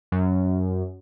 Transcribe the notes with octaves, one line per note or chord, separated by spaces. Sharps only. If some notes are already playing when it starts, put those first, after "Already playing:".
F#2